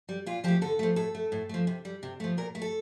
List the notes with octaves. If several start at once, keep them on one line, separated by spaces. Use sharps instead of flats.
G3
A#2 F4
F3 A3 G4
D3 A4
F3 A3
A2 A4
A3
A2
F3 A3
C3
G3
C3
F3 A3
A#2 A#4
A3
A4